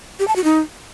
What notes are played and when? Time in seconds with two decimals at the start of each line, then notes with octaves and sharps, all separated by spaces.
0.19 G4
0.28 A5
0.36 F#4
0.44 D#4